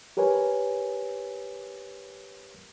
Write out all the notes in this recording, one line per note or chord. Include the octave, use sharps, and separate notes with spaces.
G4 A#4 B4 C#5 G#5